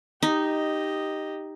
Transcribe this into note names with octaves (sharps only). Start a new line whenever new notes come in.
D#4 G4 D#5